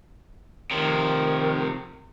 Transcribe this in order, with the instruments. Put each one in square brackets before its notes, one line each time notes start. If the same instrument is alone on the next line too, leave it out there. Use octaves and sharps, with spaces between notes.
[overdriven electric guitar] C3 F3 [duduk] D#3